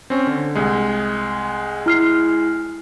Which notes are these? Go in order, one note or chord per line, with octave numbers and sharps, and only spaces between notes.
C4 C#4
D3
C2 G#3
E4 F6 C7